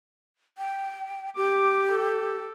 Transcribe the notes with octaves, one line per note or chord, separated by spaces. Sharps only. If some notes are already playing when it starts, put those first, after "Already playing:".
G5
G4 D6
A4